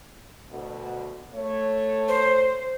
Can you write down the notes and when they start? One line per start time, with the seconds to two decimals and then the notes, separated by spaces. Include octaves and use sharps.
0.51 D2 B2
1.35 A3 C#5
2.08 C5